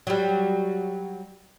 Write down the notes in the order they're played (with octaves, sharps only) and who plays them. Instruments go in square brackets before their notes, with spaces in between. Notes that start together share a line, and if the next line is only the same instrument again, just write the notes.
[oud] F#3 G3